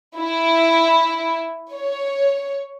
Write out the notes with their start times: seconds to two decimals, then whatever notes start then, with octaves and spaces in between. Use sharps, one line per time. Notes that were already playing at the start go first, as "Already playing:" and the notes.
0.17 E4
1.73 C#5